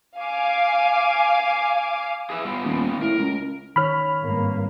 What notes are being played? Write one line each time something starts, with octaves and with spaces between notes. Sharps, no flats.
F5 G#5 D6
G#4 B4 E5
G3 B3 F4
D#1
A2 A#4
C#2
D#3 C#5 B5 F6
G#1 G2 A#3